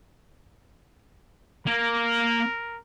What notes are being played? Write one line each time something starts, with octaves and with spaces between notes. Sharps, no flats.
A#3 A#4